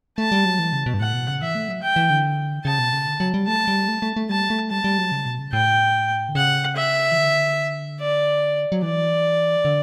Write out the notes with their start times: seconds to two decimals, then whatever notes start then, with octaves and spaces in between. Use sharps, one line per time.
0.18 A3 A5
0.32 G3
0.45 F#3
0.59 E3
0.73 C#3
0.86 B2
0.94 G2
1.00 A2 F#5
1.14 B2
1.28 C#3
1.42 E3 E5
1.55 A3
1.68 F#3
1.82 G5
1.96 E3
2.10 D3
2.65 C#3 A5
2.79 B2
2.93 C#3
3.06 D3
3.20 F#3
3.34 G3
3.47 A3 A5
3.68 G3
3.88 A3
4.02 A3
4.16 A3
4.29 G3 A5
4.50 A3
4.70 G3 A5
4.84 G3
4.98 F#3
5.12 C#3
5.26 B2
5.39 C#3
5.53 A2 G5
6.29 D3
6.35 C#3 F#5
6.76 E5
7.12 E3
7.18 D3
8.00 D5
8.72 F#3
8.82 E3 D5
9.65 D3